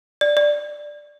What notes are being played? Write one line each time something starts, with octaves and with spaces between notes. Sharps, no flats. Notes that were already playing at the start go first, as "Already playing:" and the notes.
D5
D5